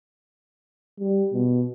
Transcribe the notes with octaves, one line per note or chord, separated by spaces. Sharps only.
G3
B2